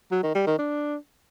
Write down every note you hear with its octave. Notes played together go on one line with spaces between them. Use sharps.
F#3
D#3
G3
D#3
D4